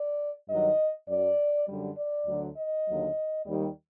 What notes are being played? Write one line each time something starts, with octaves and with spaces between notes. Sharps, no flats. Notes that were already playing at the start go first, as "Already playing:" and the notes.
Already playing: D5
G2 D#3 F#3 D#5
F#2 F#3 D5
F#2 D3 G3
D5
D2 D3 F#3
D#5
D#2 D3 F#3
D#2 D#3 G3